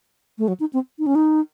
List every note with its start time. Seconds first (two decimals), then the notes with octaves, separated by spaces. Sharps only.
0.38 A3
0.48 F#3
0.60 D#4
0.73 C4
0.99 D#4
1.06 C#4
1.15 D#4